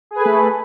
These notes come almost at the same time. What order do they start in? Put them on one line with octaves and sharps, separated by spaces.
G#4 B4 A4 A3